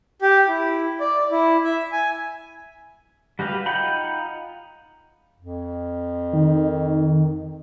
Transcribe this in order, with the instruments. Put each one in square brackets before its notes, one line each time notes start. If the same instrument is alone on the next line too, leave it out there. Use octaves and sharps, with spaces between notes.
[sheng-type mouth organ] G4
E4
D5
E4
E5
G#5
[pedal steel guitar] G3 F#4 G4 B4 F5
D#4 F4 F#5 G5 B5
[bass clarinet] F2
[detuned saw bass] D#3